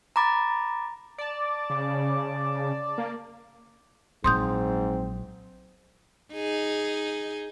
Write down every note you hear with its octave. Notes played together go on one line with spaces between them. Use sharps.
A#5 B5 D6 A6
D5 A5
C#3
A#3
A#1 G#2 F#3 C4 C6 D#6 G6
D#4 G#4